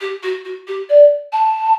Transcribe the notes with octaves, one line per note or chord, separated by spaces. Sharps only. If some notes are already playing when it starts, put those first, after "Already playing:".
G4
F#4
F#4
G4
D5
A5